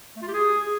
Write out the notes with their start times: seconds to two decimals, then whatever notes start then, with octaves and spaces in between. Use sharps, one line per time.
0.16 A3
0.22 F4
0.28 G4
0.34 G#4